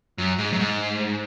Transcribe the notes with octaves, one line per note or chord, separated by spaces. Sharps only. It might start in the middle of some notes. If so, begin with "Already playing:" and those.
F#2
G#2
F#2
G#2